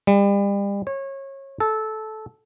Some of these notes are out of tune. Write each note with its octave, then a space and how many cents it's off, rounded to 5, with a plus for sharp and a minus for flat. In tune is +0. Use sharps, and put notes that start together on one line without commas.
G3 +35
C#5 -25
A4 -15